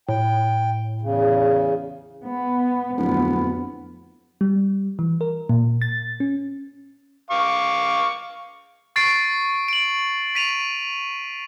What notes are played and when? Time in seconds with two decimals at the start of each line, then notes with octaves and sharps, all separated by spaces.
0.09 A2 G5
1.01 E2 C#3
2.25 B3
2.97 D1 F2 B3
4.41 G3
4.99 E3
5.21 A#4
5.49 A#2
5.82 A6
6.20 C#4
7.31 F5 C#6 D6
8.96 C#6 A6 C7 D7
9.68 D7 F#7
10.35 B6 D#7 F7